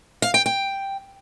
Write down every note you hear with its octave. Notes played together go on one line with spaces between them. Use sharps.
F5
G5
G5